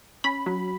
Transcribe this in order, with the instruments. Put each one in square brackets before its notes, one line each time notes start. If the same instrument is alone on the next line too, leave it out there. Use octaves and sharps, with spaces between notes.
[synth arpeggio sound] C#4 B5
F#3